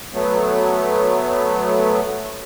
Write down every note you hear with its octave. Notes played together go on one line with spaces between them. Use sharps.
F#3 A3 B3